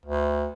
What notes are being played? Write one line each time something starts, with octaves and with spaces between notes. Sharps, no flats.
D2